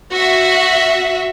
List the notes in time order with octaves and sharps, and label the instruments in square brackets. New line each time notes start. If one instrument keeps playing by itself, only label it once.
[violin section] F#4 E5